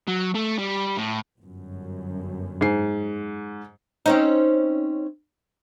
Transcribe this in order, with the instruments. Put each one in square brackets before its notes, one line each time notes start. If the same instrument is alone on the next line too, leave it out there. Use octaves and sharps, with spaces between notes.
[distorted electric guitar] F#3
A3
G3
A2
[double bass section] G1 F#2
[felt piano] G#2 C7
[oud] C4 C#4 D#4